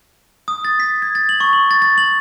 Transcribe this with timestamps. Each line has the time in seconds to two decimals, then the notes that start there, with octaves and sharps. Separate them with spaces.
0.48 D#6
0.65 A6
0.80 B6
1.02 G#6
1.15 A6
1.29 F#7
1.40 C#6
1.53 F#7
1.71 A6
1.82 A6
1.98 F#7